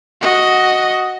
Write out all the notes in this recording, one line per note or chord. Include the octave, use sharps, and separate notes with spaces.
F#4 D#5